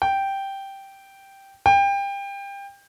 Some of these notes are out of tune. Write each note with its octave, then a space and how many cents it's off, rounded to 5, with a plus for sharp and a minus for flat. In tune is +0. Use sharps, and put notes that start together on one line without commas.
G5 -5
G5 +25